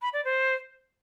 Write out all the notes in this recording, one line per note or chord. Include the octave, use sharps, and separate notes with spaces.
B5
D5
C5